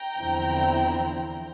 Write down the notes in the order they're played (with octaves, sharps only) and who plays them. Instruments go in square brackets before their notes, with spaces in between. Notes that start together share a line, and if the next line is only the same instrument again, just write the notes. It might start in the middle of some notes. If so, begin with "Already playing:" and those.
Already playing: [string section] G5 A#5
E2 D3 F3 C4 E4